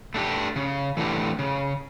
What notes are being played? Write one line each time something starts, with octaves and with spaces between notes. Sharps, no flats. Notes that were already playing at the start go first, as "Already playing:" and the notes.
A3 D4 G4
C#3
E3 A3 D4 G4
C#3